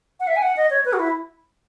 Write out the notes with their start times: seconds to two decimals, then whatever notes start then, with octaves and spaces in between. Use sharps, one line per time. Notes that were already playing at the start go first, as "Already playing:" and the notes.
0.20 F#5
0.27 E5
0.36 G#5
0.42 F#5
0.57 D#5
0.70 C#5
0.85 B4
0.93 F#4
0.99 E4